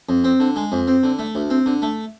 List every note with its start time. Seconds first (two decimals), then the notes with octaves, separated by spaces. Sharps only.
0.09 F2
0.24 C4
0.40 D3
0.56 G#3
0.72 F2
0.87 C4
1.03 D3
1.19 A3
1.35 D2
1.50 C4
1.66 D3
1.82 A3